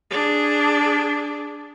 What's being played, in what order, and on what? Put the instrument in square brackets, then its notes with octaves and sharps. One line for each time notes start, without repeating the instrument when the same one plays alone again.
[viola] D4 G#4